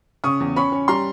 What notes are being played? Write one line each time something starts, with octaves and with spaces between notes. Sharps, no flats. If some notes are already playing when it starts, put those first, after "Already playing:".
C#3 C#6 D#6
E2
C#4 B5 C#6
C#4
G3 A#5 C6